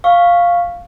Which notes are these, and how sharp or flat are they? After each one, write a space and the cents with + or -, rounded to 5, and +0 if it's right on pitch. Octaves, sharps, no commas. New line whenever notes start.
F5 +0 C#6 +0